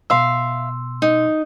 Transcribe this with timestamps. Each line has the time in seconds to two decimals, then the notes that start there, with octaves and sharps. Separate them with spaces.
0.10 B2 E5 F5 C6 E6
1.02 D#4